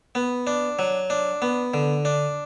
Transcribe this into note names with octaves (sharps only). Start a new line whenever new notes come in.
B3
D4
F#3
D4
B3
D3
D4